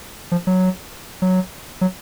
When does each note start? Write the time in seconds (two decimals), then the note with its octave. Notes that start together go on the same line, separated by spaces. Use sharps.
0.32 F3
0.47 F#3
1.22 F#3
1.81 F#3